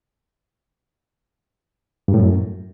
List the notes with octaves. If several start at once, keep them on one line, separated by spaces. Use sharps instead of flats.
G2
A2
F#2